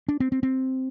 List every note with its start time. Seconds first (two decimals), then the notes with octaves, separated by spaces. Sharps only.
0.08 D4
0.20 C4
0.32 C4
0.43 C4